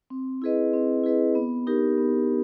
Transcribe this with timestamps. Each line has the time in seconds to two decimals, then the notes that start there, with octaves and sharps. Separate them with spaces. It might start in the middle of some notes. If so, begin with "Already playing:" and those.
0.10 C4
0.42 E4 G#4 B4 D#5
0.73 C4
1.04 E4 G#4 B4 D#5
1.35 B3
1.67 D#4 G4 A#4
1.98 B3